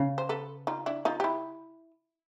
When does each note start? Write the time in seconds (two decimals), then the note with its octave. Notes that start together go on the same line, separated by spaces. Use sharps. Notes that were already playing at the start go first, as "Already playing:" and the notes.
Already playing: C#3
0.18 C5
0.29 A4 B4
0.67 D#4 F4
0.86 D4 E4
1.05 D#4 F4
1.20 G4
1.24 E4